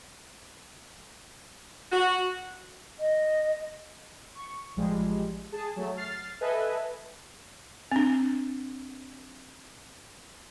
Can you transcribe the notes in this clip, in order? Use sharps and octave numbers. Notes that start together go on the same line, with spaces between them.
F#4
D#5
C#6
A1 F3 G3 G#3
G#4 A5
F#3 A3
F6 A6 C7
A4 B4 D#5 E5 G#5
C4 D4